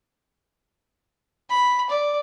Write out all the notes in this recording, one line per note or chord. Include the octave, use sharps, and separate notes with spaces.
B5
D5